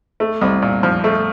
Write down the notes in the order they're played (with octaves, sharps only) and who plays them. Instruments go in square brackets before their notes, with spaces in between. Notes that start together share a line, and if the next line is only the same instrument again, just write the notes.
[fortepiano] A3
C2
A#2
F3
A3